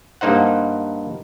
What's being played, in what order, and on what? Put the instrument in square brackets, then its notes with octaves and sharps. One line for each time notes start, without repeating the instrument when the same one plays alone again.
[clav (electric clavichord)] G2 A#3 D#4 C5 F#5